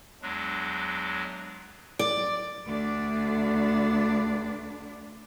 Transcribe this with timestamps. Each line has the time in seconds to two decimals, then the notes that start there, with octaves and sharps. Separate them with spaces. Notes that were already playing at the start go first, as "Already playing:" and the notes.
0.22 E2 F#3 G#3 D4
1.99 D5
2.66 D2 D4